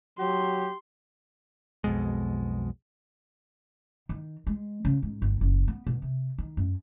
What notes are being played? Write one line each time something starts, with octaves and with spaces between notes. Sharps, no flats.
F#3 G4 C6
B1 F2 B2 G#3
D#3
G#3
C#3
G#2
G1
F#1
B3
B2
C3
D#3
F#2